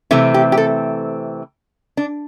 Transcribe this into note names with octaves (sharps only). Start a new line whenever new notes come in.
C3 E3 A3 C4 E4
G4
G4
A4
D4